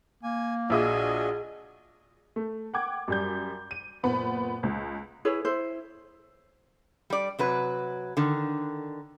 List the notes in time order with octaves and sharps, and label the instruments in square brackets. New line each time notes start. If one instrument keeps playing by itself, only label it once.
[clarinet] A#3 [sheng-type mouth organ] G#5
[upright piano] A#1 E5 D#6 [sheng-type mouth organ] D4 F#4 D#5 [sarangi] G#4
[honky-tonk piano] A3
F#5 G5 D6 G#6
F#2 G3 G6
D#7
F#1 A#2 B3 B5
C#2
[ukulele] E4 G#4 B4 C#5
E4 C5
[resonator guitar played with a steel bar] G3 D5
C3 F#3 B4
D3 D#3